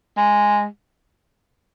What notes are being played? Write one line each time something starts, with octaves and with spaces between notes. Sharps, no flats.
G#3